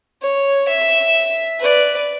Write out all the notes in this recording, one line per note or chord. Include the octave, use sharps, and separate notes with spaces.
C#5
E5
B4 D5